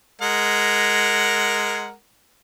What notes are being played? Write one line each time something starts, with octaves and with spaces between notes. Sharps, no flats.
G#3 A#4 F#5